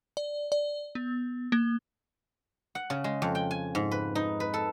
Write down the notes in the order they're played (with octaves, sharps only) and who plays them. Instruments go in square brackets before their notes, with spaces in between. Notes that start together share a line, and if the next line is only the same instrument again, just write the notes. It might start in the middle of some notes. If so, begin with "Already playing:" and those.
[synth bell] D5
D5
B3
A#3
[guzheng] F#5
C#3
G#3
F2
G5
G#5
G#2
B4
D#4
B4
A4